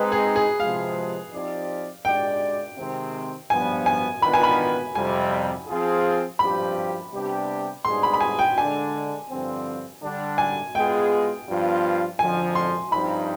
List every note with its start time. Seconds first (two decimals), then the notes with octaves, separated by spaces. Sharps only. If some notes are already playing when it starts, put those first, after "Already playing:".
Already playing: G#3 C4 D#4 B4
0.12 G#4
0.36 G#4
0.60 C3 F3 G#3 F5
1.33 F3 C4 D#4 G4 D5
2.05 G#3 D4 G4 D5 G5
2.77 C3 D#3 G#3 C4
3.50 G2 F3 B3 G#5
3.86 G#5
4.22 D#3 B3 D4 F4 B4 B5
4.34 G#5
4.43 B5
4.95 F2 C3 G3 G#5
5.68 F3 C4 F4 G#4
6.39 G2 F3 C4 G4 B5
7.12 C3 G3 B3 D4 G4
7.85 G#2 G3 B3 D4 G#4 C6
8.03 B5
8.14 B5
8.21 G#5
8.39 G5
8.57 D3 G#3 D4 G#5
9.29 G2 D3 F3 C4
10.02 D3 G3 D4
10.38 G#5
10.75 G#3 B3 F4 G#4 G5
11.47 G2 F3 B3 F4
12.19 F2 D3 F3 G#5
12.55 C6
12.92 G2 F3 C4 D#4 B5